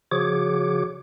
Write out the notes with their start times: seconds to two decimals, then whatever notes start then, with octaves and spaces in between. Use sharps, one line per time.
0.11 C#3 F3 F#4 G#4 C#5 D6